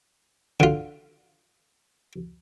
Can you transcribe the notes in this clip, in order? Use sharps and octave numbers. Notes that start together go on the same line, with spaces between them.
D3 F4